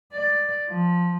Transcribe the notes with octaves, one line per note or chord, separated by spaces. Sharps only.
D5
F3